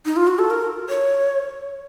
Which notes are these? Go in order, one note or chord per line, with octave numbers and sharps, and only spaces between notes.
D#4
F4
F#4
A4
A#4
C#5